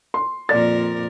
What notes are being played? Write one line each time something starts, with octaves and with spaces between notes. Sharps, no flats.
C6
F2 A#2 A#4 D5 A6